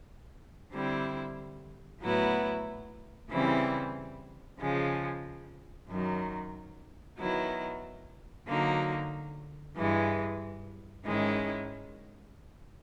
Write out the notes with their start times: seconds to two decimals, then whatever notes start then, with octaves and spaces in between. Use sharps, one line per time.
0.72 D3 G3 C4 E4
2.01 A2 F#3 B3 E4
3.31 C#3 E3 G3 C4 E4
4.60 C#3 F3 G#3
5.88 F#2 D#3 F#3
7.18 D#3 F#3 B3 E4
8.48 D3 F#3 A#3 D#4
9.77 G2 E3 G#3
11.05 G#2 D#3 G#3 C#4 E4